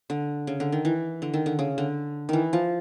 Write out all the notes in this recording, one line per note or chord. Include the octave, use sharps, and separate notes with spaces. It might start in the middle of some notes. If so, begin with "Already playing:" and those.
D3
C#3
D3
D#3
E3
D3
D#3
D3
C#3
D3
D#3 E3
F3